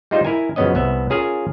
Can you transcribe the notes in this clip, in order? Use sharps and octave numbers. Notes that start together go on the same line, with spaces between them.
G3 G#3 D#4 F4 C5
E4 A#4 G#5
F#2 C#3 F3 B3 C#4 D#5
C2 B3 E5
C#4 F4 G#4 A#4 F5 G#5